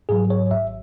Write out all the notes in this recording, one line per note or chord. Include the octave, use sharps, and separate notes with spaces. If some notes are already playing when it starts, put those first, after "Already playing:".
G#2 F#3 G#4
C#5
G#1 E5